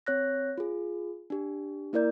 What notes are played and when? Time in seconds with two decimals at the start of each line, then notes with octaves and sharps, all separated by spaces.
0.07 C4 C#5 F#6 A#6
0.58 F4 G#4
1.30 D4 G4
1.93 A#3 E4 A#4 D5 G6